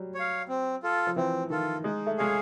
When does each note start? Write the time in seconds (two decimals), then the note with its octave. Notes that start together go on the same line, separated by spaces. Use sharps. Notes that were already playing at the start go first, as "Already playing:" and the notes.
Already playing: F#3 G3
0.15 C#5 F5
0.48 C4
0.83 F4 A4
1.07 F3
1.16 E3 C4
1.50 D#3 F4 A4
1.84 G#3 D#4
2.06 A3
2.17 G#3 G#4 C#5 F5